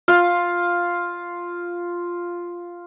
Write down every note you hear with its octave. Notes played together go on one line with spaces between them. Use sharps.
F4 F5